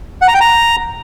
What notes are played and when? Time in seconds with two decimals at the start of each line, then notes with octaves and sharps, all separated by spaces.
0.22 F#5
0.28 A#5
0.34 G5
0.40 A#5